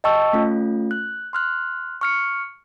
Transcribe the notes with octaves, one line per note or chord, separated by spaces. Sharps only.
D#5 G5 A5 C#6 E6
A3 C#4 F4
F#6
C6 F6 F#6
C#6 F6 C#7